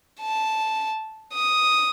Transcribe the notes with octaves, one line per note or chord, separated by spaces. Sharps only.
A5
D#6